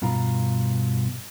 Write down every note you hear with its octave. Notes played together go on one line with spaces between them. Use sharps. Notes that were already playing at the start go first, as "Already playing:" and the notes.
G2 B2 F4 A#5